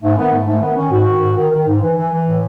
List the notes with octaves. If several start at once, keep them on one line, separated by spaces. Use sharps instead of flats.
G#2 A3
D#3 B3
G#2 A3
G#2 A3
D#3 B3
D#3 C#4
G#2 F#4
D#3
G#2
D#3
D#3
G#2
E3
E3
E3
A2